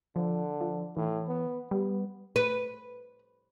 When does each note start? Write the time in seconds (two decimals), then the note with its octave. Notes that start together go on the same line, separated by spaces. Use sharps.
0.16 D3 F3
0.61 F3
0.97 A2 E3
1.28 B3
1.71 G3 B3
2.36 B4